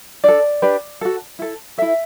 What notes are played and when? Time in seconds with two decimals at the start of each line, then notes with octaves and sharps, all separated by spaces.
0.24 D4 A4 D5
0.62 D4 G4 B4
1.01 F#4 A4
1.39 E4 A4
1.78 E4 A4 E5